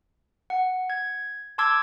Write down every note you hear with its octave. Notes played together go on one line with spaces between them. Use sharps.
F#5
G#6
A5 C6 D6 E6 G#6